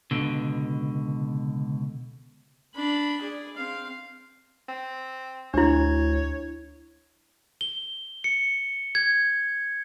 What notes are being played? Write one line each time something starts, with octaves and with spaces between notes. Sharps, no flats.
C#2 B2 D3
D4 B5
G#4 D5
C4 F5
C4
D2 D4 E4 C#5
G7
C#7
G#6